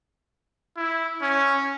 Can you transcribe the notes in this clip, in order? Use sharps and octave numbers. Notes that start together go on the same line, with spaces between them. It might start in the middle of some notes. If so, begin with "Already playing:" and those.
E4
C#4